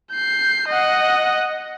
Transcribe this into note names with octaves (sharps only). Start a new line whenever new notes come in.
G6 C7
D#5 F#5